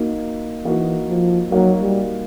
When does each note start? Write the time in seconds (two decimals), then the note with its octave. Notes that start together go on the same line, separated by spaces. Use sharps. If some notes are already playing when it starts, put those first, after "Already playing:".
Already playing: A#3 D#4 F#4
0.65 E3 A#3 D#4 F#4
1.09 F3
1.52 F#3 A#3 D#4 F#4
1.81 G3